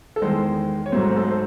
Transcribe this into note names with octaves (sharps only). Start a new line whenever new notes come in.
A4
E2 D#3 G#3 C5
C#5
G#2 F#3 A3 C5
C5
A4
C5